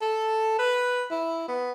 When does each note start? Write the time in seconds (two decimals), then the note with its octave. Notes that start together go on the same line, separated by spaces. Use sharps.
0.02 A4
0.59 B4
1.11 E4
1.48 B3